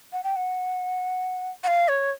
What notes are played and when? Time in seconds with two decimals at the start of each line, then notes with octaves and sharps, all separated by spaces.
0.13 F#5
0.24 G5
0.36 F#5
1.64 F#5
1.67 F5
1.88 C#5